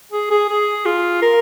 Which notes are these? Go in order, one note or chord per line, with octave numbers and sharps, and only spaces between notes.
G#4
G#4
G#4
F4
A#4